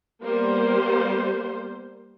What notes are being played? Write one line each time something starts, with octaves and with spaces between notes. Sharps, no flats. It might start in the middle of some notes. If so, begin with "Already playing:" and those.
G3 A#3 B3 C5